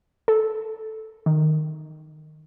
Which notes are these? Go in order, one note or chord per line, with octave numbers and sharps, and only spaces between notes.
A4
D#3